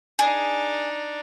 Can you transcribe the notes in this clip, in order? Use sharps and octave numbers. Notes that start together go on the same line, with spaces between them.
D4 D#4 G#4